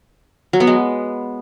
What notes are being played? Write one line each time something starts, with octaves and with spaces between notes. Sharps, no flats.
F#3
B3
G#3